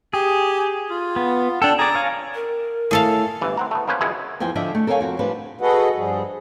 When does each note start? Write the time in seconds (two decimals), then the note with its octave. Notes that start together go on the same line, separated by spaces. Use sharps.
0.14 G4 G#4
0.90 F4
1.16 B3
1.62 D4 A4 G5
1.79 G#4 D5 A#5
1.95 C#5 F5 G#5
2.34 A#4
2.91 A2 G#4 A4 F5
3.42 G1 E3
3.57 C4 F#5 A#5
3.71 A3 B3
3.88 A#3 B3 C#4 B4 C5
4.01 C#2 F#2 G#3 E4 C#5
4.40 E2 F3 G5 G#5
4.55 D3 F3 D4 D#5 E5
4.75 A3
4.87 A4 A#4 C#5 E5 F5 G#5
5.01 F2 F#4
5.19 F3 G3 D4 B4
5.61 F#4 G#4 A4 B4 D#5 F#5
5.96 G2 F3 G3 G#4